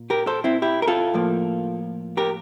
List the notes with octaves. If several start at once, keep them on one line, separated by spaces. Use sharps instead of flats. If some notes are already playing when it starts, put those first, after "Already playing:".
Already playing: A#2
G4 A#4
A4 C5
C4 E4
E4 G4
A#4
F4 A4
A2 F3 A#3
G4 A#4